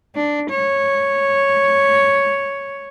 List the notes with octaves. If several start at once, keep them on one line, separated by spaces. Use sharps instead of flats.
D4
C#5